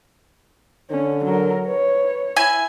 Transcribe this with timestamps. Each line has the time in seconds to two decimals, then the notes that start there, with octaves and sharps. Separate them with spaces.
0.91 D3 C#4
1.24 F#3 A#4
1.67 B4 C#5
2.36 E4 G#5